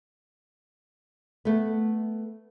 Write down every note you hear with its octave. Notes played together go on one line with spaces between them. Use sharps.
A3 B3